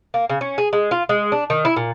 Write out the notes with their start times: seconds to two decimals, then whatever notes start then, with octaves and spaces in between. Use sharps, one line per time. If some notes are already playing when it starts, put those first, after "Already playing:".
0.14 A#3
0.30 C#3
0.41 C#4
0.58 G#4
0.73 G#3
0.91 F4
1.09 G#3
1.32 D4
1.50 D#3
1.65 E4
1.76 A#2